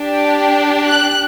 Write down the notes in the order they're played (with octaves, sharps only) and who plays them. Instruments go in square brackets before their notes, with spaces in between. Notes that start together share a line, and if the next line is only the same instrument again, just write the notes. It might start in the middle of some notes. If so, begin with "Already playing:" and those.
Already playing: [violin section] D4 G4
F#6